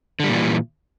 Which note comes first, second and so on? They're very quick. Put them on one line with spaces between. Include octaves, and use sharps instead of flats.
D3 G3 A#2 E3